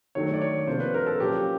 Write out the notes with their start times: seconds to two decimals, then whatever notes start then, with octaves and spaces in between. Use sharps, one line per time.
0.15 D#3 F#3 A3 D4 C#5
0.33 D5
0.42 C#5
0.67 C3 F3 A#3 D4 C5
0.80 B4
0.94 A#4
1.06 A4
1.20 A#2 F#3 A#3 C#4 G4